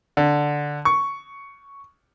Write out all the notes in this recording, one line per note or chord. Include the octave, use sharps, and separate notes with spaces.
D3
C#6